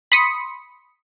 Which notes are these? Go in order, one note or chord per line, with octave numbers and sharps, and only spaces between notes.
B5 C6 D#6 B6 C#7